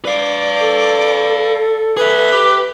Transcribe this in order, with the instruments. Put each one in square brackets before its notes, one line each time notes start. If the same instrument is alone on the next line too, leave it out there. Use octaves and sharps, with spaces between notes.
[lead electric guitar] B4 F5 [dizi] D5
[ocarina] A4
[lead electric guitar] G#4 E5 [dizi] B4
[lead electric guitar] G4